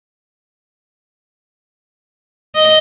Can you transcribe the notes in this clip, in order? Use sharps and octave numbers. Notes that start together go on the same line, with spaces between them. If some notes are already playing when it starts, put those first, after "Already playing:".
D#5